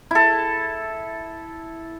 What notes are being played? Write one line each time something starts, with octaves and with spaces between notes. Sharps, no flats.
E4 A4